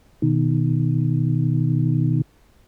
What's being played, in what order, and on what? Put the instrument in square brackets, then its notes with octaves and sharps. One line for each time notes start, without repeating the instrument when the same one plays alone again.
[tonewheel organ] B2 D#3